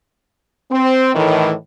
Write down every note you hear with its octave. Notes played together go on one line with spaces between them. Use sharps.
C4
A2 D#3 E3